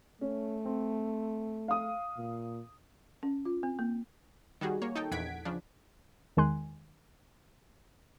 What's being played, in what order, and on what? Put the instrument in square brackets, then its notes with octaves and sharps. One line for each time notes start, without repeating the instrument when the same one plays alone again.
[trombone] A3 [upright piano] C#4
[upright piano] C4
F5 D#6
[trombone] A#2
[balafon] C#4
F4
C4
A#3
[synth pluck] D#3 G3 F#4 G#4
A#3 C#5
D#4 A4 G5
A#1 E2 F#5 G#6 B6 D7
C#3 F3 D4
E2 D#3 G#3 G#5 C6 F#6